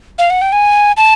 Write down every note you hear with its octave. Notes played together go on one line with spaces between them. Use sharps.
F5
F#5
G5
G#5
A5